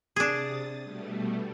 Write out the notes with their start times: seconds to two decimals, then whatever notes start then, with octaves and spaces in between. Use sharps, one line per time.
0.16 C3 D4 G#4 D#6 A6
0.81 B2 G3 A3